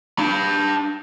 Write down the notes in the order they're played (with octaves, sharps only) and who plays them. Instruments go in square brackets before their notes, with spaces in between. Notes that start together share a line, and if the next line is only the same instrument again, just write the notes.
[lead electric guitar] D4 B5